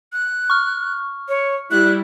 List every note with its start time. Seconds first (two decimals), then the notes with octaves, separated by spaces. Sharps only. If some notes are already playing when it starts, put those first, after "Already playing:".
0.13 F#6
0.50 C#6 F6
1.29 C#5
1.71 G3 E4 F#6